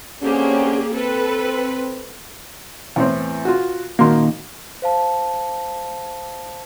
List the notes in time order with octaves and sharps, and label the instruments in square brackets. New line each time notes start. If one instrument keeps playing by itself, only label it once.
[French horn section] D3 C4 C#4 [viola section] A#3 G4 G#4
[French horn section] C4 [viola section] A4 B4
[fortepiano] E2 A2 C4
F4 F#4
[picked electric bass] D#1 D#3 A#3 [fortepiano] F#4 A#4 C6
[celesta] C5 F5 A5